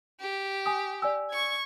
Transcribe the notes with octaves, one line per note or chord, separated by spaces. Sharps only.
G4
G#5 D#6
D5 G#5 E6
C#6 G#6